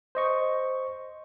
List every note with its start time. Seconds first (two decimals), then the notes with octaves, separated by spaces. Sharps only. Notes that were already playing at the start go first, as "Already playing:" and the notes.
0.15 C5 D#5 C#6